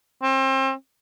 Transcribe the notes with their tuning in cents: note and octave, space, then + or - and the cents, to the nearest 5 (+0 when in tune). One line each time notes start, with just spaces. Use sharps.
C4 +35